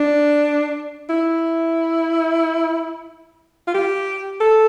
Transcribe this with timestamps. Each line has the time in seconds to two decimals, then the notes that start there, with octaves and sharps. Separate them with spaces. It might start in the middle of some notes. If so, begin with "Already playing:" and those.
Already playing: D4
1.10 E4
3.67 F4
3.74 G4
4.41 A4